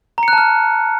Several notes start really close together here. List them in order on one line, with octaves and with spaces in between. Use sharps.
A#5 C#7 F#6 A5 F6